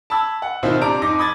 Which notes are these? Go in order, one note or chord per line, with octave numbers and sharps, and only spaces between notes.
A5 B5 E6 G#6
F#5
B2 D#3 C4 E4 F4
C3 D4 A#5 D7
F2 D#4 D6 A#6
B5 D#6 G#6 A6